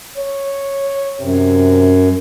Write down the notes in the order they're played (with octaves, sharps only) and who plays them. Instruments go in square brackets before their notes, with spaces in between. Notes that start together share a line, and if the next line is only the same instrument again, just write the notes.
[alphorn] C#5
[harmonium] F#2 [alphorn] C3